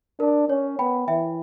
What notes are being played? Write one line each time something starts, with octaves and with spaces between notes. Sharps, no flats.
D4 A#4
C#4 C#5
B3 G5 B5
E3 E5 G5